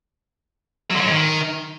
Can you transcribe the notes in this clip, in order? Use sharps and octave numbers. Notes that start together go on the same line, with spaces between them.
F#3
D3
F#3
G#2
D#3